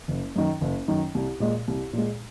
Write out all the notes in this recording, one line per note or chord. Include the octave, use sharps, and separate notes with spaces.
F#1
F#2 D#3
F#1
F#2 D#3
C2
A#2 G#3
C2
A#2 G#3